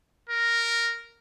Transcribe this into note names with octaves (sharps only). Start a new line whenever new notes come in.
A#4